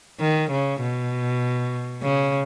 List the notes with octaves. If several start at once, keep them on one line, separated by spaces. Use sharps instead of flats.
D#3
C#3
B2
C#3